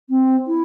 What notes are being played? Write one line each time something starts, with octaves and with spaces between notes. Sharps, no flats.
C4
E4